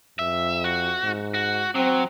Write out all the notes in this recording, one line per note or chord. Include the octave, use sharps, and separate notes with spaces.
F2 E5
F#4
G#2
F#4
F#3 C4